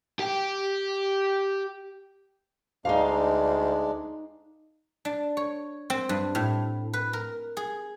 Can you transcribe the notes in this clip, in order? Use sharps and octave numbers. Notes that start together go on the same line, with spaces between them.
G4 G5
D2 G#3 D4 D#4 F5
D4
C#5
C4
G2
A2
B4
A#4
G#4